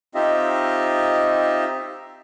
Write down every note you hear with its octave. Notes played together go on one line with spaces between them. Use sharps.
C4 D#4 F4 G4 D#5 E5